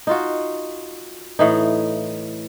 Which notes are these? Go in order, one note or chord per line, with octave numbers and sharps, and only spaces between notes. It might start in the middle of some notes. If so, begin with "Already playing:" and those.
D#4 F4 F#4
A2 E3 D#4